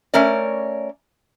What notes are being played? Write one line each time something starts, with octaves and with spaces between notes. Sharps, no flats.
A3 C#4 A#4 C#5 D5